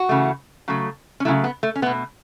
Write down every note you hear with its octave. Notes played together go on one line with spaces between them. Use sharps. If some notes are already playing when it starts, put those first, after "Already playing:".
Already playing: F#4
C#3 E3 A3
C#3 F#3 A3
C#4
C#3 F#3 A3 E4
B3
A3
C#4
B2 A3 B3